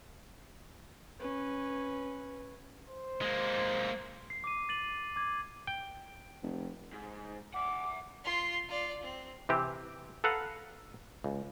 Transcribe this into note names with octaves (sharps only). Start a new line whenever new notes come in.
C#4 B4
C5
G#3 A#3
C7
D6 D#7
A6 D#7 F#7
D6 G#6
G5
F1
G#2
E5 F#5 D6
F4 C6
F4 D5
C4
C3 E3 C4 G4
A4 B4 F5 F#5 A#5
C#2